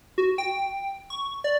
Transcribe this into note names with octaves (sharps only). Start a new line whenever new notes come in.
F#4
G5
C#6
D5